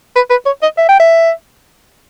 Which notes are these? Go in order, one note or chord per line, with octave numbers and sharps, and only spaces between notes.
B4
B4
C#5
D#5
E5
G5
E5